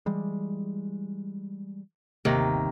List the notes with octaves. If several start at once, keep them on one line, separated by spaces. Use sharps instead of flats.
E3 G3 G#3
G1 D#2 C3 D#3 A#3